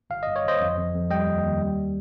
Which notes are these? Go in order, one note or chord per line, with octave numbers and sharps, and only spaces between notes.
G1 F5
G2 D#5
C#5
G1 C5 D#5
F2
F2
F2
G3 D#5 G5
D#2
D#2
G3